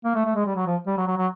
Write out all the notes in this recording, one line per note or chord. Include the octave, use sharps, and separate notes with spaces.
A#3
A3
A3
G#3
G3
F#3
F3
G3
F#3
F#3
F#3